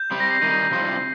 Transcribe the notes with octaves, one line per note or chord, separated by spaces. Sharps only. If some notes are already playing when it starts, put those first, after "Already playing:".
Already playing: G6
G3 C4 G4
A#6
C7
D#3 G3 D#4 D#7
C3 G3 C4 F4